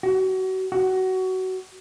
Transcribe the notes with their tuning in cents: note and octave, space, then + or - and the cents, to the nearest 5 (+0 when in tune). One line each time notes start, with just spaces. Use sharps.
F#4 +30
F#4 +20